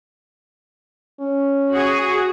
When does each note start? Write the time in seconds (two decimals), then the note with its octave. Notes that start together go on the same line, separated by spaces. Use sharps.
1.20 C#4
1.70 F#4 G#4